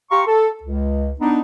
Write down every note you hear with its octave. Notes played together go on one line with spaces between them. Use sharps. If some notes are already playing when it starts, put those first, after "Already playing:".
G4 F5 A#5 C6 C#6
A4
C#2
B3 D4 D#4